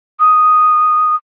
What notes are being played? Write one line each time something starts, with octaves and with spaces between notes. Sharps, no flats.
D#6